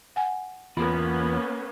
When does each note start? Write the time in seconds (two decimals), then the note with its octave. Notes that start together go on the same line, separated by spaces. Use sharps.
0.16 F#5 G#5
0.77 E2 A#3 B3 C#4 F4 B5